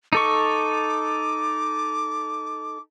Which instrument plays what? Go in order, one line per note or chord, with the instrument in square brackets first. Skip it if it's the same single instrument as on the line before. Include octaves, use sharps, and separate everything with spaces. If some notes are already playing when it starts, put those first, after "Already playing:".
[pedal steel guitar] D#4 A4 C#6 [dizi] D6